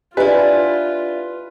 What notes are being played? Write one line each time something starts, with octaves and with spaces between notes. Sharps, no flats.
D4 E4 F4 G4 B4 D#5 G#5